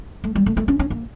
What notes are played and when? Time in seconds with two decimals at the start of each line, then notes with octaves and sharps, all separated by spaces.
0.24 A3
0.35 G3
0.46 A3
0.57 A3
0.68 C#4
0.79 C#4
0.90 A#3